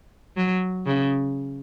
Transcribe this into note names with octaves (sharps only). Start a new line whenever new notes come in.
F#3
C#3